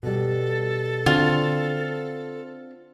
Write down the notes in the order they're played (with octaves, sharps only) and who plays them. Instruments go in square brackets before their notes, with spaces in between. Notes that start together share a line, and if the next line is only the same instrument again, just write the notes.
[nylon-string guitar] B2 G3 [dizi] A4
[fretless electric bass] D3 [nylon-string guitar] C4 D4 F#4 [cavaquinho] F4